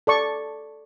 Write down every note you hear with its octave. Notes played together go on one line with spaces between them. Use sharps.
A4 D5 C#6